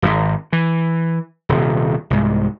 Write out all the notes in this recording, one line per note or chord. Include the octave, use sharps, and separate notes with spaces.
D#1 G#1
E3
D#1 C3
C2 G#2